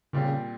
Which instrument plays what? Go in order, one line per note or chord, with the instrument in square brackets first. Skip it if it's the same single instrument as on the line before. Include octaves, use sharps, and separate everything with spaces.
[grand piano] A#2 G3 C4 [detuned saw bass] C#3